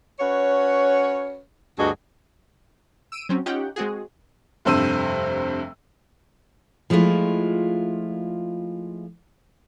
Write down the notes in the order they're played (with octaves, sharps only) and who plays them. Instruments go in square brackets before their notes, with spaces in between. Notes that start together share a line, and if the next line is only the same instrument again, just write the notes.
[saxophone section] C#4 F#4 B4 C#5
D2 G2 D4 F#4 G#4 D#5
[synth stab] E6 D7 D#7
F#3 C4 C#4
C#4 D#4 F4 G4 F#5 G5
G#3 C4 F#4 G#4
[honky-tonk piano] F1 G2 C3 C5 E6 D#7
[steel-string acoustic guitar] F3 G#3 A3 E4 F4